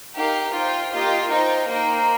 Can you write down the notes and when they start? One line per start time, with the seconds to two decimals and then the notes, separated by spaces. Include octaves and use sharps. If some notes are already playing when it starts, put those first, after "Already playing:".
0.15 D#4 G4 A#4 F5
0.54 D#4 F4 C5 G5
0.92 A#3 F4 G4 D#5 G5
1.31 D#4 F4 C5 G5
1.69 A#3 D#4 C5 D#5 G5